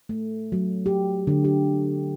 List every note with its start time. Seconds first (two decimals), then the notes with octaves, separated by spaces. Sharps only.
0.09 A3
0.52 F#3
0.86 G4
1.27 D3
1.44 G4